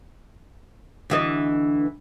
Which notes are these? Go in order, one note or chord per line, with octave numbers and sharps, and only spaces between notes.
D2 E3 D#5